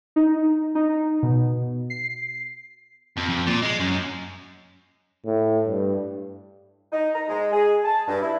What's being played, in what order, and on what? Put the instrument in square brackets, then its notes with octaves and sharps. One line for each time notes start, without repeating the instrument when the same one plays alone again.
[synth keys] D#4
D#4
B2
C7
[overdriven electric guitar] F2
F2
A#2
G#3
F#2
[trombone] A2
G2
[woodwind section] D#4
A#5
G#3
G#4
A5
G2
E4